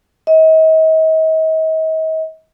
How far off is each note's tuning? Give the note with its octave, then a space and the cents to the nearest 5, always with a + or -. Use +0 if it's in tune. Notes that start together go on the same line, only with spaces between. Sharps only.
D#5 +40